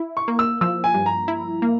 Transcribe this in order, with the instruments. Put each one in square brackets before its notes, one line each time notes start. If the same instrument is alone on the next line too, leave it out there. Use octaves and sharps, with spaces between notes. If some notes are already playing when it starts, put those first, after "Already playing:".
Already playing: [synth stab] E4
[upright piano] C#6
[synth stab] A#3
[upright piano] E6
[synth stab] F3 [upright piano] E6
[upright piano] G#5
[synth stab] G2
[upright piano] A#5
[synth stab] E4
A#3